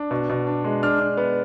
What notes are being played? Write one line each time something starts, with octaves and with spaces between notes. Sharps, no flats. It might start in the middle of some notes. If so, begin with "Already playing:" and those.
Already playing: D4
B2
B2
D4
G#3
D4 F6
D4
B3